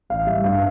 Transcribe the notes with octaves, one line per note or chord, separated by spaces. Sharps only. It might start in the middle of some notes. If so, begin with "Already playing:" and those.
A1 F5
G3 E5
G2 F5